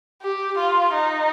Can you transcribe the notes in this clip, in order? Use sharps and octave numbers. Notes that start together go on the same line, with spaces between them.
G4
F4
D#4